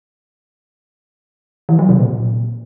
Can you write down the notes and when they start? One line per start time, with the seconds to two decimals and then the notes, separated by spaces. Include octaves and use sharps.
1.69 E3
1.79 F#3
1.89 C3
1.99 A#2